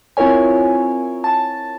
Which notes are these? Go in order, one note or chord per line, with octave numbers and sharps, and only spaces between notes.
C4 E4 F4 A#4 C#5 G#5
A5